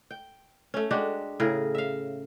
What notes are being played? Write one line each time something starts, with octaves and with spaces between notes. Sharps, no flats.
G5
A3 C#4
G#3 D4 F#4 G4
A2 C#3 G#4 A#4
E5 F5